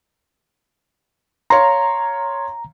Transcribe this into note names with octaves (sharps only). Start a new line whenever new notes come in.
C#5 F5 A#5 C6